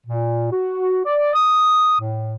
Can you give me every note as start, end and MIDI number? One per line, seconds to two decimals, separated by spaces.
0.06 0.51 46
0.51 1.00 66
1.05 1.31 74
1.34 1.99 87
2.00 2.35 45